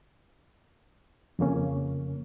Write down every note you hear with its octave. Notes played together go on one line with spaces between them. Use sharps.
F2 C#3 A#3 C#4